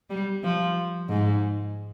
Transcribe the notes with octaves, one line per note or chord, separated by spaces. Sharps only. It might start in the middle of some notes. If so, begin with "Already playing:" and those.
G3
F3
G#2